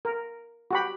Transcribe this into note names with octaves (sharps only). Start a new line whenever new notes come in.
A#4
F#4 G4 B5